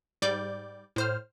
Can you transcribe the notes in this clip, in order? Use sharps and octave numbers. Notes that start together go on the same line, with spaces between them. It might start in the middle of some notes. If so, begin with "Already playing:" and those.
G#2 G3 D5 D6 G6
A2 C5 F6